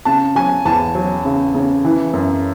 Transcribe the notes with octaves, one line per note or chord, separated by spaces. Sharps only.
C#3 A5
F#3 G#5
E2 A5
F#3
C#3
C#3
E3
F#2